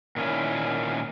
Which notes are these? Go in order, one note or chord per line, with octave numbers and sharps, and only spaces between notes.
A#2 D#3 C#4 E4